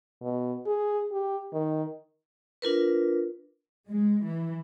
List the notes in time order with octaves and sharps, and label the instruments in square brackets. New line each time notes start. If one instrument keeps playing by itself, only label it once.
[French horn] B2
G#4
G4
D#3
[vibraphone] D4 F4 A#4 B4
[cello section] G#3
E3